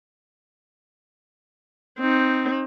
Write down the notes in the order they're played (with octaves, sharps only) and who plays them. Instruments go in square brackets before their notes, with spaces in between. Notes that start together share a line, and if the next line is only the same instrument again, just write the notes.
[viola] C4 D#4